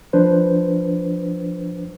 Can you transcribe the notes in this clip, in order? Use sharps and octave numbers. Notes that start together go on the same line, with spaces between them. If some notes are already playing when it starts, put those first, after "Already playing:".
F3 D4 B4 C5